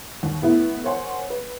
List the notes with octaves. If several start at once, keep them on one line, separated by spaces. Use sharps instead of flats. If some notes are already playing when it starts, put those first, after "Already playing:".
D#2
A2 B3 E4
A#4 C5 C#5 F#5 G#5 C6
B4